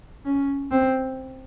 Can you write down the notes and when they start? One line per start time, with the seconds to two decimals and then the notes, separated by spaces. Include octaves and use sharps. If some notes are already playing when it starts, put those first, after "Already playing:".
0.25 C#4
0.71 C4